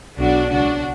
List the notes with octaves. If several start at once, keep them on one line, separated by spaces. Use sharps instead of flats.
B1 B2 F#3 D4 F#4
C#2 B2 F#3 D4 F#4